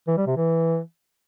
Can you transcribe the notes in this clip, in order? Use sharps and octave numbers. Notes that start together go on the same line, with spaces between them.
E3
G3
C3
E3